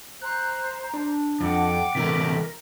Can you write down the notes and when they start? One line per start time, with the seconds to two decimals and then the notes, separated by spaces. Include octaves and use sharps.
0.22 C5 A#5 F#6
0.94 D4
1.40 F2 F#5 G5 D6
1.95 C3 E3 A3 A#4 B6